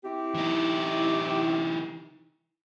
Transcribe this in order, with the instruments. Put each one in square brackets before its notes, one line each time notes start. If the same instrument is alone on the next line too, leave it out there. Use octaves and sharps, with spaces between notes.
[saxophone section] C4 E4 G4
[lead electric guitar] E3 D#4